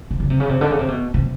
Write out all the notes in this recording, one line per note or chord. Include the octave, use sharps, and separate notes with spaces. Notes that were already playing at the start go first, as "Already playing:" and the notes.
C3
C#3
C3
C#3
C3
D3
C#3
C3
B2
C3